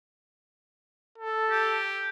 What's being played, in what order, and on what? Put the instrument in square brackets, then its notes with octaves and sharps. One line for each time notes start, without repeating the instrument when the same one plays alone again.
[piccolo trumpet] A4
[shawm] G4